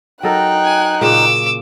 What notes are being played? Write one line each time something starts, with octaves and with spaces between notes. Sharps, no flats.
F#3 D#4 A4 A#4 G5 F#6
G#5
A#2 C#3 D6 E6